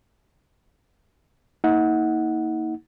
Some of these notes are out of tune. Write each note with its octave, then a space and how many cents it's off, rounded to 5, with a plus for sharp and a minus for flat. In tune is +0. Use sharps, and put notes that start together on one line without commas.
A#3 -10 D#4 +40 F#5 -10